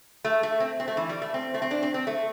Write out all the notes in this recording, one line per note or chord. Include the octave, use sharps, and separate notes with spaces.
A3
A3
C4
C4
A3
E3
G3
A3
C4
A3
C4
D4
C4
C4
A3